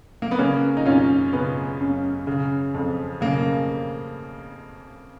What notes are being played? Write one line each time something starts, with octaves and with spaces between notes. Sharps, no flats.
A#3
B3
C#3 A#3 C#4
D#4
F#2 C#4 F4
C#3 B3
F#2
C#3
F2
C#3 A#3